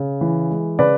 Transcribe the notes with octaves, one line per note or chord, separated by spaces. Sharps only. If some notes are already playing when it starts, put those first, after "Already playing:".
Already playing: C#3
E3
G#3
C#3 B4 D5